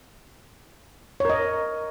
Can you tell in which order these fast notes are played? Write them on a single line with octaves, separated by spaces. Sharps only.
C#5 A#4 D#5